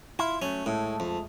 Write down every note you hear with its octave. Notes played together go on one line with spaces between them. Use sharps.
E4 F4
F#3 G#3 A3 C#4
A2 G#3 A3 A4
F2